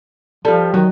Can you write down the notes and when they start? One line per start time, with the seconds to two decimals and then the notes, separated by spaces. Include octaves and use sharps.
0.45 F3 G3 F4 A4
0.74 D#3 F#3 D#4 F#4